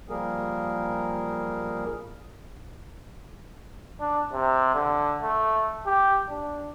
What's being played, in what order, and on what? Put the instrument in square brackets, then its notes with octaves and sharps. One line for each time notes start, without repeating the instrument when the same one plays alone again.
[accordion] F3 G3 A#3 G#4 A#4
[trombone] D4
C3
D3
A3
G4
D4